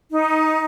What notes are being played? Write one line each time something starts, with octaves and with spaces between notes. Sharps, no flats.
D#4